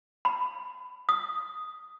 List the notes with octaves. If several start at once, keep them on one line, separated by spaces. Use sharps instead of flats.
B5
D#6